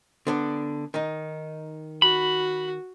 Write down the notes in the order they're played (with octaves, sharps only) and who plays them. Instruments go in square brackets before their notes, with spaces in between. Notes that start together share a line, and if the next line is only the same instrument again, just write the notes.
[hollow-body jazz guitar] D3 B3 D4
D#3 D#4
[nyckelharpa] F#4 [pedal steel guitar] B5